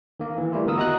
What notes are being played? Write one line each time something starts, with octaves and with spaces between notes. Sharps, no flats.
D#3 A#3
E3
G3 A3 A#3 E4 F4
D3 D#3 B3 A#4 D#6 E6
F#4 D#5 A#5 D#6 F#6